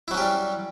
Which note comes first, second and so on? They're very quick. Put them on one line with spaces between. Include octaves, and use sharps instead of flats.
E4 F#3 C#4 G4 G3